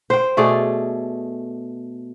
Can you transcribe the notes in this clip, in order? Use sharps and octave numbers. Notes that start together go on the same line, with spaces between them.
C5 G5
B2 A3 G#4 D5